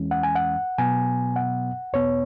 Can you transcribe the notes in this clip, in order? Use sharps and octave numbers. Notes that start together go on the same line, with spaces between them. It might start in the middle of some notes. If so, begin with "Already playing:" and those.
Already playing: E2 E3 G#3 C#4
F#5
G#5
F#5
B2 F#3 B3 G#5
F#5
E2 B2 B3 C#5